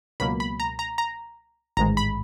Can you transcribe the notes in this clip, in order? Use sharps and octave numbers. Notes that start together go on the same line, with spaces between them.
C#2 B2 F#3 A#3 B5
B5
A#5
A#5
A#5
A1 G#2 D#3 G#3 A#5
B5